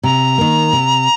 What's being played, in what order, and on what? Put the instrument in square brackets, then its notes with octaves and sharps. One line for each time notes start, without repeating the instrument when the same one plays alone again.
[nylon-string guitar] C3 [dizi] A#5
[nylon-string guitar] D#3 A#3
C3